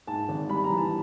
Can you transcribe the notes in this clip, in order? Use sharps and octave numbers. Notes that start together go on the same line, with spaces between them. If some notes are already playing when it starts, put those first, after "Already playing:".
G#2 A5
G#1
G3 B5
A#5
E3
A5